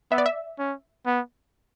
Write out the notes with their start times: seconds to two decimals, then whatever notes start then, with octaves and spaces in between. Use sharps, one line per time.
0.11 B3 E5
0.18 D5
0.26 E5
0.59 C#4
1.06 B3